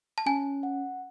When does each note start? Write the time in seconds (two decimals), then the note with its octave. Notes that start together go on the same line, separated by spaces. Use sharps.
0.18 A5
0.26 C#4 G#5
0.63 F#5